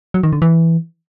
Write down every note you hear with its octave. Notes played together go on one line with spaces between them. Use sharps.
F#3
D#3
D3
E3